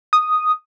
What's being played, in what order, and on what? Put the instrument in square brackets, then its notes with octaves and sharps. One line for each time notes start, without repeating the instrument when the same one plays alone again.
[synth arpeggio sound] D#6